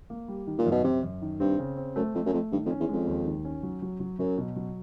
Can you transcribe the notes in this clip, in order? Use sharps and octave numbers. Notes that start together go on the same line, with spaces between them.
A#3
G3
D#3
A#2
F#2
B2
F#2 C3
F#2
D#3
G2 C4
C#3
C4
F#2 A3
F2 A3
F#2
F2 A3
G2 D#3
F2
C#4
E2
F2 G#3
D#2
D#3
C#4
F#3
F#3
F#3
F#2 F#3
B2
F#3